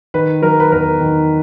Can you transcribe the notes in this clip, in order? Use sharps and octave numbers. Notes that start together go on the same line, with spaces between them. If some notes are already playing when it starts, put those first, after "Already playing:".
D#3 B4
F#3 A#4
B4
E2 A#4
D#3